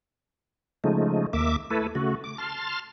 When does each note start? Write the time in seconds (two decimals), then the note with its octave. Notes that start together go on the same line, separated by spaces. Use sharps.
0.84 C#3 F3 G#3 A3 D#4
1.33 D#2 A#3 E5 D6
1.70 A3 E4 A4 B4
1.95 C#3 A3 F#4
2.24 D6
2.38 A5 C6 F6